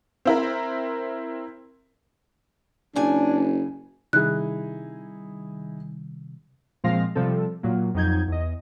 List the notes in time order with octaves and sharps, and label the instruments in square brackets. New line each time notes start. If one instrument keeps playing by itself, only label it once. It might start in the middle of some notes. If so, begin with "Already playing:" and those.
[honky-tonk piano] C4 E4 A#4
[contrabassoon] F#1 [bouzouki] C#3 G#5 [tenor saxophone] D4
[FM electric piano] C3 D#3 G3 [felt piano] D#4 E4 G#4 [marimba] F#6
[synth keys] A#2 F3 G#3 C4 F5 A#6
C3 F3 G3 C4 A4
A#2 F#3 A#3
F2 F#3 D#4 G6 G#6
E2 D#5